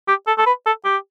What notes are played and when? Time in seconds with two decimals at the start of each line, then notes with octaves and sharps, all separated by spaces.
0.08 G4
0.27 A4
0.38 A4
0.46 B4
0.66 A4
0.85 G4